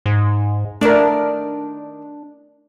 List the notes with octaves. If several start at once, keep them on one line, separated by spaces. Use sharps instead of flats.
G#2
D#3 A3 D4 A#4 D5 F#5